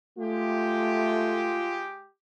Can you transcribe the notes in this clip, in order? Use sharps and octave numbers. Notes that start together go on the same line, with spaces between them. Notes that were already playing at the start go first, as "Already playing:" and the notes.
G#3 A3 F4 G4